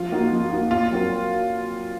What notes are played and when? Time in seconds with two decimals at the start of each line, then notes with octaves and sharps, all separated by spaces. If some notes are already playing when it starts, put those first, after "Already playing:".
Already playing: F3 F4
0.12 A#3 D#4 F#4
0.32 F3
0.51 A#3 D#4 F#4
0.71 A#2 F4
0.91 F#3 C4 F#4 A#4